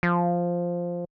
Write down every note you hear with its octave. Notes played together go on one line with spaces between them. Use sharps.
F3